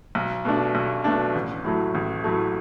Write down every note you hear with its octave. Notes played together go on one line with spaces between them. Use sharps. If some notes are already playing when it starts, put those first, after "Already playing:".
B1
B2 A3 D4
B1
B2 A3 D4
A1
A2 F#3 A3
A1
A2 F#3 A3